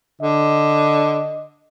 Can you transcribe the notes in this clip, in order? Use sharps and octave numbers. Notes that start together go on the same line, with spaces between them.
D3 D#5